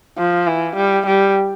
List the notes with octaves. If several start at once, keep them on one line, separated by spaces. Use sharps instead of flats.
F3
E3
G3
G3